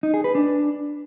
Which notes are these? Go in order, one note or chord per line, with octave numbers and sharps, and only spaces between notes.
D#4
G#4
B4
D4